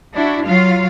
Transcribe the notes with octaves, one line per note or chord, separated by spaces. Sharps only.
D4 E4 F#4
F#3 F4 F5